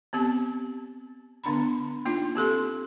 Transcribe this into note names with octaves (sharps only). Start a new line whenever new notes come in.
B3 C4 G4 A5
D3 B3 D4 A#5 B5
A#3 D4 D#4 F4
C4 G4 A4 C6